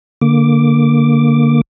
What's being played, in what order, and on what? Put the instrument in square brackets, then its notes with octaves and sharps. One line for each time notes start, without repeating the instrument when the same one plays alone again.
[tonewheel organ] D3 A#3 D6